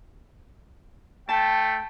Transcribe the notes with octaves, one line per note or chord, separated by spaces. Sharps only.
A3 G5 A5